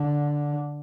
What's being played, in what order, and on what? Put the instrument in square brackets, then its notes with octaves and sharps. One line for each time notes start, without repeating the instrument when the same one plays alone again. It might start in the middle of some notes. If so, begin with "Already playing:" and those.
Already playing: [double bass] D3